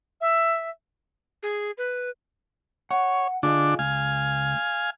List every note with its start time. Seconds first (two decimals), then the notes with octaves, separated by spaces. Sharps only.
0.20 E5
1.43 G#4
1.78 B4
2.91 C#5 F#5
3.43 D3 D4 F4 G#4 D#5
3.79 C#2 F5 G#5